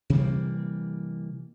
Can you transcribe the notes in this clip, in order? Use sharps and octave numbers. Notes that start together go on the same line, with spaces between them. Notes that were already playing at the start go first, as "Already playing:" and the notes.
C3 E3 G3 A#3